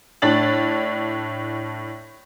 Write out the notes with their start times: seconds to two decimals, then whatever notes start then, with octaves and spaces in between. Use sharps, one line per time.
0.22 A2 D4 A6 F#7